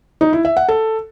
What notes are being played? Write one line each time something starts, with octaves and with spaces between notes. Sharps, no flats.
D#4
E4
E5
F#5
A4